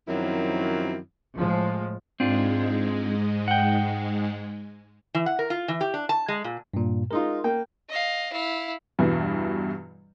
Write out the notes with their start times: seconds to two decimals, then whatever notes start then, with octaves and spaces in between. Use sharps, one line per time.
0.08 F#2 D#3 F3 F#3 C4 E4
1.35 A2 F3 G#3
2.20 G#2 G#3 C4 D4 F4
3.48 F#5 G5
5.15 E3
5.26 F#5
5.39 A#4
5.50 F4
5.68 E3
5.81 G4
5.94 D4
6.09 A5
6.28 G#3
6.44 A#2
6.74 G2 A#2
7.11 G#3 D#4 F4 A#4
7.44 A#3 G5
7.89 D#5 F5
8.32 E4 F5
8.99 E2 G2 B2 E3 G3